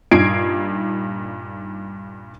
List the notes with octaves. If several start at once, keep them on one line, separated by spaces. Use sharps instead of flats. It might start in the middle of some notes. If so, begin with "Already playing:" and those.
G2 A#2 D#4 G#6 C7 D7